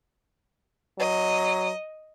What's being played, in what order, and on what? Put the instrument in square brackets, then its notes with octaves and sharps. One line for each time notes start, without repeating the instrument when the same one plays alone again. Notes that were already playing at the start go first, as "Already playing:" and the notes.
[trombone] F#3 [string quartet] D#5